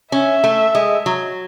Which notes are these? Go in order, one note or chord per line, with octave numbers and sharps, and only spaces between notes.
C#4 E5
A3
G#3
F#3